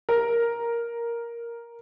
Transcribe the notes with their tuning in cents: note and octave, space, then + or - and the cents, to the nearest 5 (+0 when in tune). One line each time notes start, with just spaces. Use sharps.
A#4 +5